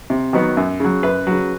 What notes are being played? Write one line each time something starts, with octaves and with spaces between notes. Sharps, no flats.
C3
D#3 F#3 B3
F#2
C#3 F#3
F#2 B4
C#3 F#3